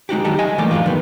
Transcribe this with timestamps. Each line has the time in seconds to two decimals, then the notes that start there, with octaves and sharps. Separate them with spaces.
0.09 G#3 D#4 F#4 G4
0.24 D#3 F#3 G3 D#4 G4 A4
0.39 D#5 G#5
0.58 E3 G3 A3 A#3 G4 D5
0.71 F#2 A2 F#3 G#3 D#4 F4
0.86 D#3 B3